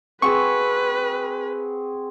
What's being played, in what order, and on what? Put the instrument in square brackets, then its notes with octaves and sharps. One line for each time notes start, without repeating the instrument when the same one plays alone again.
[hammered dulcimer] C4 F#4 G#4 [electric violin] B4 [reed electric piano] C#6